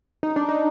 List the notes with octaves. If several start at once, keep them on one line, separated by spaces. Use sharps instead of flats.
D#4
D4
D#4